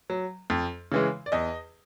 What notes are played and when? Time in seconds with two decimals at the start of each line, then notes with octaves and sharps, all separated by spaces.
0.10 F#3
0.50 F2
0.92 C#3 E3 G#3
1.26 D5
1.32 E2 D#5